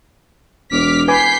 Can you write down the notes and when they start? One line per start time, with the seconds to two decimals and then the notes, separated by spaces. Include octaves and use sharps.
0.71 E1 D6 F6 B6
1.08 B4 G#5 D6 G6 B6 C7